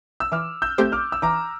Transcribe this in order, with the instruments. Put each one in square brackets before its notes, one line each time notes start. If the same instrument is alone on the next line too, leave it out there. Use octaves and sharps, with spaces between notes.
[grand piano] E6
[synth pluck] E3 [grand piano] D6 F6
[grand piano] E6 G6
[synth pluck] A3 C4 G4 C5 [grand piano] G6
[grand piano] D6 F6
E6
[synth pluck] E3 [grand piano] A#5 D6